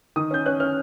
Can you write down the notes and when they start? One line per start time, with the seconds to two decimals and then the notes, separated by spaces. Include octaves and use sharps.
0.16 D#3 D#6
0.31 C#4 G6
0.46 C#4 F#6
0.60 C#4 F6